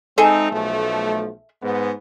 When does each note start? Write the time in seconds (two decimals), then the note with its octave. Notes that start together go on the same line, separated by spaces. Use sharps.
0.18 G#3 C4 D#4 G#4 A4 E5
0.51 B1 F3 A3
1.63 G#2 B3